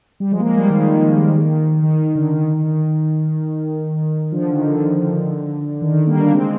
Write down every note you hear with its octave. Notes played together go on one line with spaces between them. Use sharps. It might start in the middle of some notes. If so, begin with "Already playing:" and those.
G3
F3 G#3
A#3
F3 G#3
G3 A#3
D#3 G3
D#3
D#3
D3
D#3
D3 F3
D#3
D3
D#3
D#3
G3 A#3
A#3 D4
G#3 C4